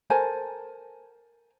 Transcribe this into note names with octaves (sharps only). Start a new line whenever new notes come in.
A4 A#4 C5 G#5